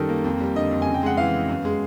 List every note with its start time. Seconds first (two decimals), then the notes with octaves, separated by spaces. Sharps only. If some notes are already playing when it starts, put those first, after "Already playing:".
Already playing: F#2 D#3 G3 A4 A#4
0.09 A#3
0.24 F2
0.40 G3
0.56 D3 D#5
0.71 F2
0.82 G#5
0.87 C#3
0.94 G5
1.03 G#3 F#5
1.17 E3 F5
1.33 B3
1.48 F#2
1.65 G#3